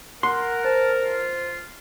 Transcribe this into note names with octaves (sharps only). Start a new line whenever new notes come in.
A#4 F#5 C6
C5 A5
F4